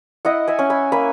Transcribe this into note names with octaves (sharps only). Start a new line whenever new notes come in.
E4 D#5 F#5
E5 G#5
C#4
G#5 B5
A#3 G#5 B5